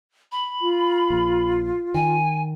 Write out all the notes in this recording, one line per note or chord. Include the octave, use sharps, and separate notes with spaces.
B5
F4
A#1
D#3 G#5